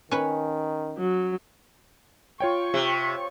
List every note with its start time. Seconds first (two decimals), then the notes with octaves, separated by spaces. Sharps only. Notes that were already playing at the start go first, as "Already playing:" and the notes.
0.11 D#3 C#4 B4
0.98 F#3
2.40 F4 C#5 G5 C#6
2.74 C3